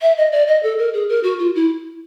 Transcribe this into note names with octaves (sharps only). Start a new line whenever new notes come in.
E5
D#5
D5
D#5
A4
A#4
G#4
A#4
F#4
F4
E4